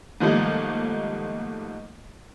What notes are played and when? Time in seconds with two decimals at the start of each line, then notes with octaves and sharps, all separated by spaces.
0.20 G#2 D#3 F3 G3 A3 A#3